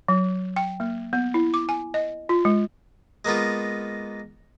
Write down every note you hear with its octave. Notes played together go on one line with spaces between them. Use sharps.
F#3
G5
A#3
B3
E4
D6
G#5
D#5
F4
G#3
G#3 A#3 B3 F4